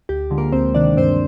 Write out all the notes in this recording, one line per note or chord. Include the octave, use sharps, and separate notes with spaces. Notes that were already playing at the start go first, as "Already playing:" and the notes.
D2 G4
D3 F3 G#3
A#3 A#4
D2 C4 C5
C3 D#3 D4 D5
G2 C4 C5